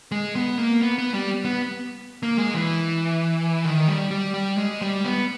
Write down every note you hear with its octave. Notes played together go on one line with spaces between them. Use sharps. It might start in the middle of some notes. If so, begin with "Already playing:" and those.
G#3
B3
A#3
B3
B3
G3
B3
A#3
G#3
E3
D#3
G3
G3
G3
G#3
G3
B3